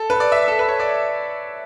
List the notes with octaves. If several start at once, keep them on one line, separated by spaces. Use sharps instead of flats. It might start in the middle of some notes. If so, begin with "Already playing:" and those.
Already playing: A4
B4
D5
E5
A4
B4
C#5
D5